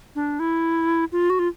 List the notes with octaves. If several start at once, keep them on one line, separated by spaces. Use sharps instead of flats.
D4
E4
F4
F#4
F4